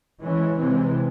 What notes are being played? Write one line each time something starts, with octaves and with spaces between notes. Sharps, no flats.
E3 G#3 C#4
C3 E3 G#3 C4